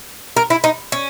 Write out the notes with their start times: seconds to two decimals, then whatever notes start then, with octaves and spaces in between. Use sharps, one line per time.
0.37 A#4
0.50 E4
0.64 D#4
0.92 C#4